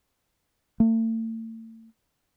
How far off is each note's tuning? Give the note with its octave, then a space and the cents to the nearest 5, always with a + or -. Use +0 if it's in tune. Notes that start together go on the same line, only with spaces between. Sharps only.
A3 +40